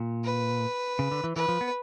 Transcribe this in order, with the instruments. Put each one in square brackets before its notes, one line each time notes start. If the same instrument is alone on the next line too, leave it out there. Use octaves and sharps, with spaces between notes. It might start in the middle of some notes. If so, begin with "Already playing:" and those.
Already playing: [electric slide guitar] A#2
[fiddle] B4
[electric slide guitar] C#3
D3
E3
[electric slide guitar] E3 [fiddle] B4
[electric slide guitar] F3
B3